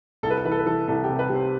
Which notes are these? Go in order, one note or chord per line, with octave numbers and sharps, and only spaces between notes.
C2 A4
B4
A4
E3 B4
A4
B4
E3 A4
C2 A4
G4
C3
B4
C3
C5